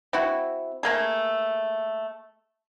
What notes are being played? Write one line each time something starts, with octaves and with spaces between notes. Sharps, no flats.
C4 E4 F#4
A3 A#3 G#4